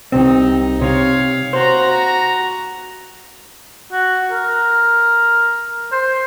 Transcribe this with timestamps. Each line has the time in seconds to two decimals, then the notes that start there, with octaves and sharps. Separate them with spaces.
0.12 C2 C4 D#4
0.81 C3 C#5 F5
1.53 F#4 C5 A#5
3.92 F#4
4.31 A#4
5.92 C5